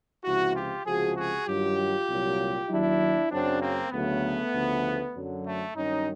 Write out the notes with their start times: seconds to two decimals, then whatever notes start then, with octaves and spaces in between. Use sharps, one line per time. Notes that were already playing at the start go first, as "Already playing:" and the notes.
0.24 C#2 C3 F3 E4 F#4
0.55 F4 G4
0.86 C#2 C3 F3 F#4 G#4
1.16 F#4 G#4
1.46 G2 D#3 F#3 F4 G4
2.08 C2 A#2 F#3
2.69 D#2 D#3 F#3 D4 E4
3.30 F#2 C#3 F#3 C4 D4
3.61 A#3 C4
3.91 D2 C#3 F#3 A3 B3
4.53 D2 C#3 F3
5.15 F#2 D3 F#3
5.45 A3
5.76 G2 D#3 F#3 C#4 D#4